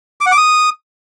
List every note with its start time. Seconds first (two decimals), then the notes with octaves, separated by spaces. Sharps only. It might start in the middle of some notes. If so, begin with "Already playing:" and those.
0.21 D6
0.26 F#5
0.32 D6
0.37 D#6